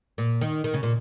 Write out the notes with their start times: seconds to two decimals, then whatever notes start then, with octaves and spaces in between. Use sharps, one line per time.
0.18 A#2
0.41 D#3
0.64 D#3
0.74 C#3
0.83 A#2